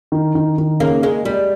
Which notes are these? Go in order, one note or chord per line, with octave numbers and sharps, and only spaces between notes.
D#3
D#3
D#3
C#3 A#3
G#3 A#3
G3 G#3